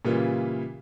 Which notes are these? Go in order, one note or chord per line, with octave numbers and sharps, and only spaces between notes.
A#2 C#3 E3 G3 A#3 F4